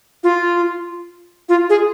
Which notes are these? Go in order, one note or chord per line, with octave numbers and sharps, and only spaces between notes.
F4
F4
G#4